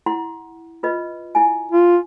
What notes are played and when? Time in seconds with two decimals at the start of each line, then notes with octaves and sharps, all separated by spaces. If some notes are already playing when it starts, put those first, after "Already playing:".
0.06 E4 F#5 C6
0.83 F4 B4 D#5
1.35 E4 G#5
1.72 F4